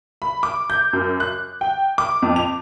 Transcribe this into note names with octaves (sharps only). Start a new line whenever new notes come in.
B5
D6
G6
F#2
F#6
G5
D6
F2
F7